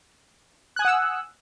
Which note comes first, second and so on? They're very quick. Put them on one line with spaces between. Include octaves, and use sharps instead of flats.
F#6 G#5 D#6 F#5 E6